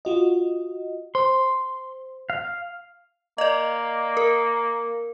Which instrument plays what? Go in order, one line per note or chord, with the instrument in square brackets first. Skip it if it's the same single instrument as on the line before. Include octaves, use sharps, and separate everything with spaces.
[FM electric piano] F4 F#4 D#5
[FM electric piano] C5 [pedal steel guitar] C6
[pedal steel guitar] F5
[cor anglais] A#3 [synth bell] D5 D#5
[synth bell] A#4